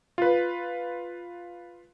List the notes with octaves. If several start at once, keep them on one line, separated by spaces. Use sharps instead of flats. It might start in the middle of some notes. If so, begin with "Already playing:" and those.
F4 B4